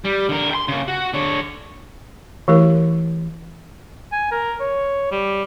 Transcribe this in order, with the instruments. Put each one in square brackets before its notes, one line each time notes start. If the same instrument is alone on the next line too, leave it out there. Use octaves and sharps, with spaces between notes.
[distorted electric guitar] G3
D3 A#4
G5 C6
C#3 A#3
F#4
D3 C#5
[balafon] E3 A3 E4 G4 A#4
[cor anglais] G#5
A#4
C#5
G3